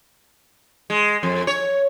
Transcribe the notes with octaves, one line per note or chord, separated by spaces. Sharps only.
G#3
F2
C#5